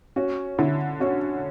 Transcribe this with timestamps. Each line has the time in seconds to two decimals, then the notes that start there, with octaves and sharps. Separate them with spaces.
0.16 C#4 F#4
0.59 D3 E4
1.00 C#4 F#4